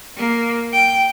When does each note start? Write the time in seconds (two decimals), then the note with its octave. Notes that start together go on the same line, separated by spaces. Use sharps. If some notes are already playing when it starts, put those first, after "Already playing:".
0.17 A#3
0.73 G5